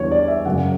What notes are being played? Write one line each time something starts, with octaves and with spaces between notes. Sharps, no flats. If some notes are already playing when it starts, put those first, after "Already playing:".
Already playing: E2 D3 G3 C#5
D5
E5
F#2 C#3 F#3 F#5